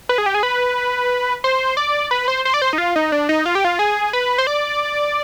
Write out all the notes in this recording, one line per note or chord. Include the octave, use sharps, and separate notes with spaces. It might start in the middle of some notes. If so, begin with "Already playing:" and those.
B4
G#4
G4
G#4
B4
C5
D5
B4
C5
C5
D5
C5
D#4
F4
D#4
D4
D#4
F4
G4
F4
G#4
B4
C5
D5